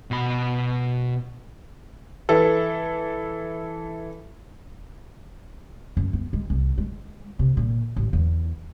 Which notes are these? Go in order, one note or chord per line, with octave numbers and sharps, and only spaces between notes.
B2 B5
E3 A4
F#2
B3
G#3
C2
G#3
C3
A#2
A1
E2